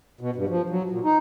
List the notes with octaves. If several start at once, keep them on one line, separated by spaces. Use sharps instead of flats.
B2
G2
F3
F#3
A#2
D#4